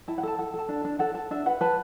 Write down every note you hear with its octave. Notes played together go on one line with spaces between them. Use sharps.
E4 A5
F#5
A4 A5
A4 F#5
A4 A5
D4
D4
A4 F#5
A4 A5
D4 E5
B4 F#5
B4 A5